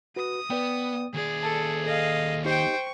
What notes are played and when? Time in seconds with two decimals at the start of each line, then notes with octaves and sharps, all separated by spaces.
0.16 F#4 B4 D#6
0.50 B3 B4 D5 G5
1.14 D#2 G#4 D5
1.43 A4 A5
1.86 A4 D#5 F5
2.45 D#4 G4 C5 D#5 G5 C#6